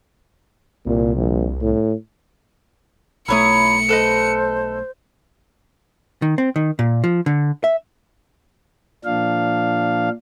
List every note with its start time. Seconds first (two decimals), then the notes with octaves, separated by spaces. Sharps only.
0.86 C2 A#2
1.16 A#1
1.62 A2
3.28 B1 A3 E4 C#5 A#5 D#6 C#7
3.89 A4 B4 C5 D#5
6.22 D#3
6.38 C4
6.56 D#3
6.79 A#2
7.04 F3
7.26 D3
7.64 E5
9.05 A#2 F3 D4 F5